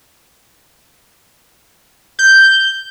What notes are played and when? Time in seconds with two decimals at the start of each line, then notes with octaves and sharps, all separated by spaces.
2.19 G6